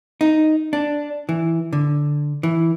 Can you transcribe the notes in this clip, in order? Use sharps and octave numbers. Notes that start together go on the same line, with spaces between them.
D#4
D4
E3
D3
E3